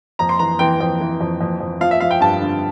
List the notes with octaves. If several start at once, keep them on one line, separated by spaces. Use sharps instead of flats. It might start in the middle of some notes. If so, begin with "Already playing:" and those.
F2 A#5
C6
E3 A#5
E3 G5
F2 G5
E3
F2
F2
F2
F3 F5
E5
F3 F5
G5
G2 A5
D3